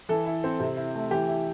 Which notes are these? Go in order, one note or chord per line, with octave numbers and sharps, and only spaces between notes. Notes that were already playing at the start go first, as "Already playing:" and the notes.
E3 A4
E4
C4
C3
E4
A3
E3 G4
E4